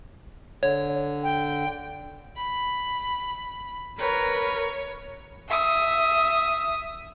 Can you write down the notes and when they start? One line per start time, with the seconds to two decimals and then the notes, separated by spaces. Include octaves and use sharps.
0.63 D3 C#5
1.23 G5
2.36 B5
3.99 A#4 B4 C#5
5.49 E5 D#6